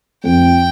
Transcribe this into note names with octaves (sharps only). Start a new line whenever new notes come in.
F2 G5